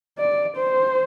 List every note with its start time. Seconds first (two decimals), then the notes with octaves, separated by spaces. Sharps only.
0.18 D5
0.57 C5